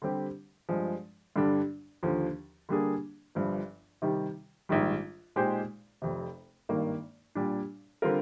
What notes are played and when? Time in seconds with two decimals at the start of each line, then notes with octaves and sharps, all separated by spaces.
0.02 D3 G3 C4 G4
0.69 G2 F3 G#3
1.36 G2 D3 G3 D4
2.03 D#2 D3 F3
2.69 D3 G3 A#3 D4 G#4
3.35 G1 G2 F3
4.02 C3 D#3 G3
4.69 A#1 G#2 D#3 G3
5.36 A#2 G#3 D#4 G4 C5
6.02 F1 F2 C3
6.69 G#1 G2 D#3 A#3
7.35 A#2 G3 D4
8.02 D3 G3 C4 F4 A#4